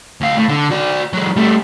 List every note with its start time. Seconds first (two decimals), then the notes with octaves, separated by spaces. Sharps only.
0.21 D2 F5
0.37 A2
0.48 D3
0.71 F#4 D5
1.13 F#3 G#3
1.37 G3 A3